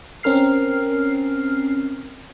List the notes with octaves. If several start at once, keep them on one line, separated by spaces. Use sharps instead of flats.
C4 C#4 A#4 F6 C7